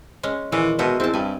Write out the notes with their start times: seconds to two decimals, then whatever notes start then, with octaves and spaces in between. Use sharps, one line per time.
0.23 G#3 C#4
0.52 A#2 D#3 E3 G#3
0.79 B2 G#3 D#4 E4
1.00 E2 C4 A5
1.14 G2 G#5